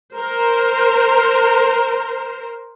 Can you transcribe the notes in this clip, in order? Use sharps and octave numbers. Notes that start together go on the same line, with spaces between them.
A#4 C5